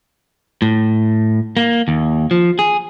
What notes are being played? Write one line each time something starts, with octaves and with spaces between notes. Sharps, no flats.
A2
A#3
D#2
F3
G#4